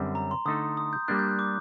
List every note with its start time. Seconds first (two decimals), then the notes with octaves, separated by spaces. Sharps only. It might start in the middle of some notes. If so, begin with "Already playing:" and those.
Already playing: F#2 D3 G3 C4
0.15 A#5
0.31 C6
0.46 D3 A3 D#4 A4 D#6
0.77 D#6
0.93 G6
1.08 G3 A#3 D4 F#6
1.19 G6
1.28 F#6
1.39 D6